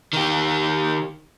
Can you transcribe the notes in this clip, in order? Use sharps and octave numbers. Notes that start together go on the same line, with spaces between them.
D#3 G4